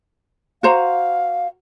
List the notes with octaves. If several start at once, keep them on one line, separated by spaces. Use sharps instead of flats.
F#4 C5 F5 A#5